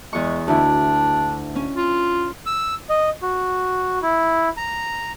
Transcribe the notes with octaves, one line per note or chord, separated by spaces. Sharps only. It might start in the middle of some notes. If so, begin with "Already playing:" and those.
E2 G#3 C#6
D2 D4 E4
C#4
F4
E6
D#5
F#4
E4
A#5